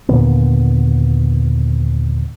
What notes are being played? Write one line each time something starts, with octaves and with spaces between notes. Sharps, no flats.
D#2 A#2 D3 B3